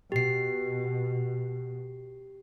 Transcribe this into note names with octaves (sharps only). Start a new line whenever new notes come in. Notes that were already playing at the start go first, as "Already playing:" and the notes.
B2 G4 C7